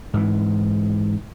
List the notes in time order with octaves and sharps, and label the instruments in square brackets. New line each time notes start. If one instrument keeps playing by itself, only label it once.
[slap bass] G#2 E3